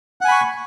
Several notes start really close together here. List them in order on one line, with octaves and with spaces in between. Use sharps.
F#5 G#5 B5 C#6